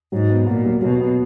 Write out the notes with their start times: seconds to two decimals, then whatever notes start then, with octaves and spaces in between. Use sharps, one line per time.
0.12 G#2 F#3
0.29 B3
0.46 A#2 F#4
0.65 F#3
0.82 B2 F#3
1.00 B3